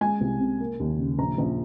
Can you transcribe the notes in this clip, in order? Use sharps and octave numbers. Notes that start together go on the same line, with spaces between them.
G#3 G#5
C2
C3
A#3
D#2
C#3
A#1 A#5
A#1